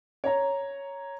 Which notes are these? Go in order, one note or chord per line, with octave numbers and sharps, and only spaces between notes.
C#5 A#5